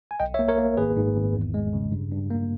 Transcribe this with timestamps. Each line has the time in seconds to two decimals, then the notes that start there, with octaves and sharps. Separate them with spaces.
0.11 G#5
0.20 B1 D#5 G5
0.34 C#5 E5
0.39 A#3
0.48 A#4 C#5
0.58 A#3
0.77 G#1 G#4 B4
0.97 G#2
1.16 G#1
1.35 E2
1.54 G#3
1.73 C#3
1.92 G2
2.12 G2
2.31 A#3